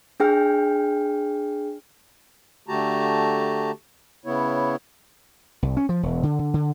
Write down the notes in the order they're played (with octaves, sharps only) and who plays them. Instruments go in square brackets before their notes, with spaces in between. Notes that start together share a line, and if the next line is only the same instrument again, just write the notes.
[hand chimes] D4 G#4 G5 F6
[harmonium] D3 A3 F#4 G4 A5 A#5
C#3 B3 E4 C#5
[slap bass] C2
C#4
F3
E1
D3
D3
D3